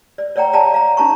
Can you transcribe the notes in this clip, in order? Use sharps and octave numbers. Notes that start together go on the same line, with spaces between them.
D5
C#5 D5 F#5 G5 A#5
D5 F5 G5 A5 A#5
F5 A#5
C#4 D#4 A5 A#5 C#6